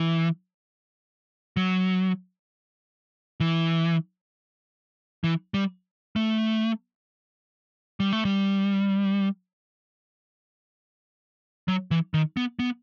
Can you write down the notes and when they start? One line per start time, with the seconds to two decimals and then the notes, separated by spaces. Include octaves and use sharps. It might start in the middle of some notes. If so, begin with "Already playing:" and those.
Already playing: E3
1.57 F#3
3.40 E3
5.24 E3
5.54 G3
6.16 A3
8.00 G3
8.13 A3
8.25 G3
11.68 F#3
11.91 E3
12.14 D#3
12.37 B3
12.59 B3